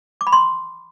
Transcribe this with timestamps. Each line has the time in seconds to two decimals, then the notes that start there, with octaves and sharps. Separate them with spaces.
0.21 D6
0.27 B5
0.33 C6